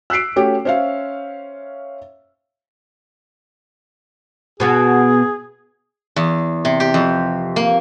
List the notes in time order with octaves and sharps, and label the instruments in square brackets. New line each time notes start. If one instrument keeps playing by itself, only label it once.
[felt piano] E6 F#6 B6 C7 D7
A3 C#4 F#4 G4
C#4 C5 C#5 E5 F5
[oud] B2 B3 F#4 [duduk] G#4
[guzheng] E2
C3
G4
F2
A#3